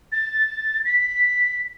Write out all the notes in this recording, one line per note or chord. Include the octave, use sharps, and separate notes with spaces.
A6
B6